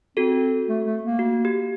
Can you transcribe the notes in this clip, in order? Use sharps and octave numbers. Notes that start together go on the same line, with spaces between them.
C4 F#4 A4
A3
A3
A#3
F#4
G4